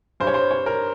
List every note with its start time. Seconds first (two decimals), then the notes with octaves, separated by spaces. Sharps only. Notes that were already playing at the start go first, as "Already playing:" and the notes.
0.20 G2 G3 C5
0.27 C#5
0.34 C5
0.51 C#5
0.66 A#4